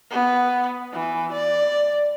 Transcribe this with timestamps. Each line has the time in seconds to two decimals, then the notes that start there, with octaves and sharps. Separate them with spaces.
0.10 B3
0.93 E3
1.32 D5